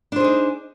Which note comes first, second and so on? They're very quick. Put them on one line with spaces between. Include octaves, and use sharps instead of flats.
D4 C5 G#4 D#4